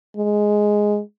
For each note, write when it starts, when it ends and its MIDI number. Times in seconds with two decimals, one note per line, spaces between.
0.17 1.01 56